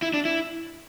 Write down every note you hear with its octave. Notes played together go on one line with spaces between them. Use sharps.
E4
D4
E4